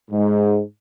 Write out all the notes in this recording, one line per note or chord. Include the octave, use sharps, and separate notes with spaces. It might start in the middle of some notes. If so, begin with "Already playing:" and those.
G#2